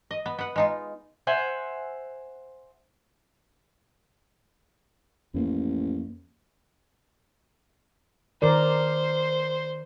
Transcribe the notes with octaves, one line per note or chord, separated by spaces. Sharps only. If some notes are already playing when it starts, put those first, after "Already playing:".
D#5
B3
B3 F#5
G#3 D#4 F4
C5 E5 F#5 G#5
A1 F2 A#3
D#3 A#4 C5 D5